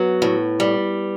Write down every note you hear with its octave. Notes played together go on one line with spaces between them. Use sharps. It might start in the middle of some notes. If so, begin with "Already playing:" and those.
Already playing: F#3 B3
A2
G3